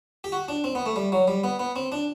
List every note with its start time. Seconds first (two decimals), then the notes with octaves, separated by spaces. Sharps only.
0.24 G4
0.32 F#4
0.48 D4
0.64 C4
0.75 B3
0.86 A3
0.96 G3
1.12 F#3
1.28 G3
1.44 B3
1.59 B3
1.76 C4
1.92 D4